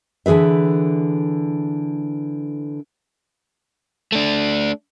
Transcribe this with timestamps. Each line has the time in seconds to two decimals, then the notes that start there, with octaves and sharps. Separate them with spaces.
0.26 D3 E3 G#4 B4 E5
4.12 A3 D4